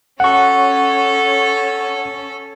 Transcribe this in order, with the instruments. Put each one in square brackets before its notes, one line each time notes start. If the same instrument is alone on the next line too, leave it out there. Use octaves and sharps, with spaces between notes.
[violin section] C#4 A4 [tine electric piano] F#5 C#6